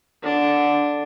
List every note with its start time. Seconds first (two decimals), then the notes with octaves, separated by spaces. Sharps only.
0.24 D3 D4